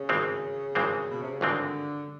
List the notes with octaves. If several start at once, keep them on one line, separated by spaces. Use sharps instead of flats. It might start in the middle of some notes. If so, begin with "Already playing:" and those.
Already playing: C#3
G#1 G2 E3 G#3 C4
G#1 G2 E3 G#3 C4
B2
C3
C#3
G#1 G2 D3 E3 G#3 C4